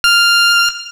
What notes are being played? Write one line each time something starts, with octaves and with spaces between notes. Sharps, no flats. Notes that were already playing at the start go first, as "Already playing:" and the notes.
F6